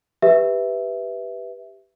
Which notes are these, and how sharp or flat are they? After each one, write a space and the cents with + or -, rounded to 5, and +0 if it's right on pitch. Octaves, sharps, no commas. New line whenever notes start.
G4 +0 B4 +0 E5 +0